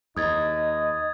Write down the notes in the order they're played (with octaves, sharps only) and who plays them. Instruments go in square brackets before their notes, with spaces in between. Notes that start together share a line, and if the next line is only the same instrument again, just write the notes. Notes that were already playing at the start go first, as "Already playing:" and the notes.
[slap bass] D#2 [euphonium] D#4 [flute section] D#5 [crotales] D#6 G#6 A6